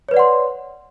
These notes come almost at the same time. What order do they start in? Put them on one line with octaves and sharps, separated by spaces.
C#5 B4 D5 F#5 C6